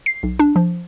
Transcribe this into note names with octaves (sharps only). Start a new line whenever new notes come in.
C7
B1
D4
F3